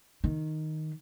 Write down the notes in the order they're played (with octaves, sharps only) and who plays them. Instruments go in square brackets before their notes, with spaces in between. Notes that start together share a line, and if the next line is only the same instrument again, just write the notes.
[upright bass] D#3